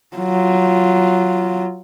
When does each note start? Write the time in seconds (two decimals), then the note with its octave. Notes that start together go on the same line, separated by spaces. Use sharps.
0.16 F#3 F4